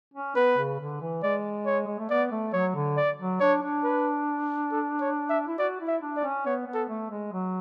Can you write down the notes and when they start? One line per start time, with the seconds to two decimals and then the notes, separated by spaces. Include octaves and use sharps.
0.14 C#4
0.36 B3 B4
0.57 C#3
0.79 D3
1.01 E3
1.23 G#3 D5
1.66 C#5
1.87 G#3
1.99 A3
2.10 B3 D5
2.31 A3
2.53 F#3 C#5
2.75 D3
2.97 D5
3.19 F#3
3.40 D4 C#5
3.62 D4
3.84 B4
4.72 A4
5.01 C#5
5.30 E5
5.47 E4
5.58 F#4 D5
5.81 E4
5.87 E5
6.02 D4
6.17 D5
6.23 C#4
6.46 B3 C#5
6.67 B3
6.74 A4
6.89 A3
7.11 G#3
7.32 F#3